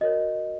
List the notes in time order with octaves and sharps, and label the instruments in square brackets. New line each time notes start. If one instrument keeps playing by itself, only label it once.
[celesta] F#4 A#4 C#5 D#5